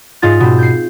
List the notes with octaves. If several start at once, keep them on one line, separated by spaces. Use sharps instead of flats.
G#2 F4 D#5 A6
B2 C4
G6 C7